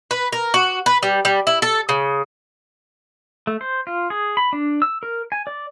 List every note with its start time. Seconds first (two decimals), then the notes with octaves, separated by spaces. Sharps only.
0.11 B4
0.33 A#4
0.54 F#4
0.86 B4
1.03 G3
1.25 G3
1.47 E4
1.62 A4
1.89 C#3
3.47 A3
3.61 C5
3.87 F4
4.10 G#4
4.37 B5
4.53 D4
4.82 E6
5.03 A#4
5.32 G#5
5.47 D5